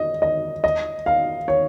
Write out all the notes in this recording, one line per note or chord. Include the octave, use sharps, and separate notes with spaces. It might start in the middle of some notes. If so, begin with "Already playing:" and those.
Already playing: D#5
D#5
D#5
F5
C#5